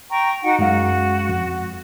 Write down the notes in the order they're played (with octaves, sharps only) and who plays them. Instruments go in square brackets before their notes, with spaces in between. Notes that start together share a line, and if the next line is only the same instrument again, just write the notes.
[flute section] G5 A#5 C#6
D#4 F#4 F#5
[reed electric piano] F#2 G#3 F5 [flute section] F#4
[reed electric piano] F2